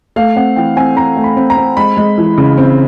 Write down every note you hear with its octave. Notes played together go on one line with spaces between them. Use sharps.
A3 F5
C4 F#5
E3 G5
C4 G#5
C4 A#5
A3
B5
C4
A#5
C4
G#3 B5
G#3
E3
C#3
C4